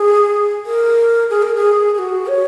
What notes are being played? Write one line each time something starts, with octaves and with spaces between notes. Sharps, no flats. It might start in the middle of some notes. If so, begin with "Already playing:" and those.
Already playing: G#4
A#4
G#4
A#4
G#4
G#4
F#4
C#5